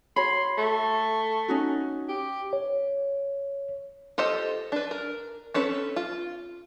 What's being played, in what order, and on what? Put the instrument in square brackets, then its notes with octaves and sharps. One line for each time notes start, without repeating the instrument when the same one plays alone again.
[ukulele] F#4 C#5 B5 [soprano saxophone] C6
[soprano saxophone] A3
[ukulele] C#4 D#4 F#4
[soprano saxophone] G4
[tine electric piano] C#5
[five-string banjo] F4 G4 A4 C5 D#5
D4 B4
A#4
C4 C#4 A4 B4
F4